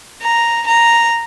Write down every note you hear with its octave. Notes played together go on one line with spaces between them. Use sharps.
A#5
A#5